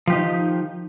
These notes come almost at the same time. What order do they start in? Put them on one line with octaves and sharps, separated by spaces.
F3 G4 D#4 D#3